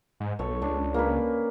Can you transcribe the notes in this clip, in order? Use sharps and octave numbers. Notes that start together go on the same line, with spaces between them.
G#2
B1 A4 C#5
C#2 D4
A#3 C#4 B4